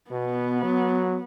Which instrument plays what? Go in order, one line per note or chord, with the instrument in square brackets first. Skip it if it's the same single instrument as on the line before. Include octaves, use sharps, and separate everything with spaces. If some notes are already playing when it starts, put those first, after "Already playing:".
[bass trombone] B2 [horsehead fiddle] B3
[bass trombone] F#3